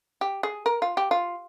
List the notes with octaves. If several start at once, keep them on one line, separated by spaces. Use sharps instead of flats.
G4
G#4
A#4
F4
G4
F4